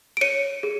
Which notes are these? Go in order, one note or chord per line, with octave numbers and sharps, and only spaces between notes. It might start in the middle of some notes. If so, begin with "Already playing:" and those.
D7
C#5 C#7 D#7
G#4